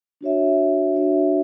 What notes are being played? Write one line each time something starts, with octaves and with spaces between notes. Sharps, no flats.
D4 F#4 C#5 E5
D4 F#4 C#5 E5